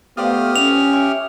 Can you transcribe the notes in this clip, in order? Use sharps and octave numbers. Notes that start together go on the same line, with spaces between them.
A3 B3 F4 G4 C5 D5 D#6 F6
C#4 F7
E4 E5 C#6